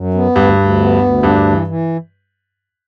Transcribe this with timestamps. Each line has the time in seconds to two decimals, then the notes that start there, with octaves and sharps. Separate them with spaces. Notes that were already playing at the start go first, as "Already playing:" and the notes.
Already playing: F#2
0.14 B3
0.36 D2 G2
0.58 D2
0.80 B3
1.02 D2
1.23 G2 D4
1.46 E3
1.67 E3